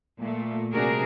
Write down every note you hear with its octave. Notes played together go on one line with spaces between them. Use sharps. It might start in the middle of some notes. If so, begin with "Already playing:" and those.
A#2 A3
C3 G3 D4 F#4 G#4 A#4